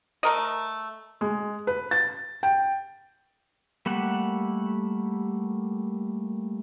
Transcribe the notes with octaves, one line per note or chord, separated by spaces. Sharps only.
A3 A#4 D#5
G#3
B4
A6
G5
G3 A3 A#3 F#5